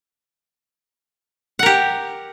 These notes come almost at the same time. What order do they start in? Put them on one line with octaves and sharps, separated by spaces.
F#5 A#4 G4